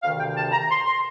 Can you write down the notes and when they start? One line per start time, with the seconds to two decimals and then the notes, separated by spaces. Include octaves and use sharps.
0.03 D2 C3 D#3 F5
0.19 G5
0.37 A5
0.52 A#5
0.70 C6
0.86 C6